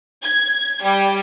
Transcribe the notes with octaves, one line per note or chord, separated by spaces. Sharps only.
G#6
G3